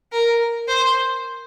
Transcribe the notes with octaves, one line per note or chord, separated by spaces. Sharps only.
A#4
C5